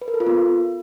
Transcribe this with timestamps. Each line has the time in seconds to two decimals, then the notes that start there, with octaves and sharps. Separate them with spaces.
0.02 B4
0.08 A#4
0.14 A4
0.20 F4
0.27 B3